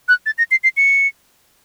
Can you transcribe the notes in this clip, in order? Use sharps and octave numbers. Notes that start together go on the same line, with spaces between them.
F#6
A6
A#6
C7
C7
C#7